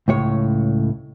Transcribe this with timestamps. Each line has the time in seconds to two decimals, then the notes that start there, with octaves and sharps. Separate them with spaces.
0.08 C#2 A2 C#5